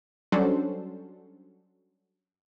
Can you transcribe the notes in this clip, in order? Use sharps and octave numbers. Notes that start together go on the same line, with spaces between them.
F#3 G3 C#4 D4 A4 C5